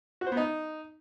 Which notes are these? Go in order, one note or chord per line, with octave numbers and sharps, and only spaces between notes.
F#4
C5
B3
D#4